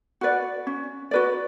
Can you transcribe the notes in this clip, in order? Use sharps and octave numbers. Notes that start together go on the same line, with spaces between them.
F#4 B4 D5
C#4
F#4 B4 D5